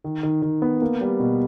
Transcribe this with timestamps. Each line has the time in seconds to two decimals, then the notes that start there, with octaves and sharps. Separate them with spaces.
0.04 D#3
0.23 D#3
0.42 D#3
0.62 B3
0.82 A#3
1.01 G3
1.20 B2